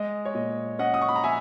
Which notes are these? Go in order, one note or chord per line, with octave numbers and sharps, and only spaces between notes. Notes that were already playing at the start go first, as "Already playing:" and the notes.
Already playing: G#3 D#5
C#5
A#2 D#5
C#4 D#5 F#5
D#6
C#6
B5
A#5
E5 G#5